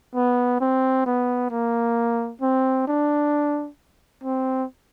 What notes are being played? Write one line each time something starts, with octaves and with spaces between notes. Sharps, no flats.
B3
C4
B3
A#3
C4
D4
C4